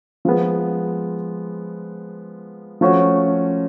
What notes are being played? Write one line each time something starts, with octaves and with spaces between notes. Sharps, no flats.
F3 G#3 B3
F3 A3 C#4 F#4